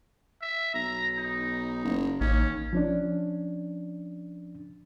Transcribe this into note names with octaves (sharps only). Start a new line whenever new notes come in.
E5
B1 A#5
D#4
F#1
A1 D#2 C#4
F3 C#4 D4